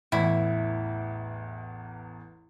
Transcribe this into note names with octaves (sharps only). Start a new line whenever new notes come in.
A1 E2 E4